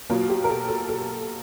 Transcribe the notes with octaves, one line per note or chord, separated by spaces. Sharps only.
B2 F#3 A#3 F4
G4
A#4
A4
A4
A4